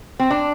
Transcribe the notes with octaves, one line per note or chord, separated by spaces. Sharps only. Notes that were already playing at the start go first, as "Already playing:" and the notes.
C4
D4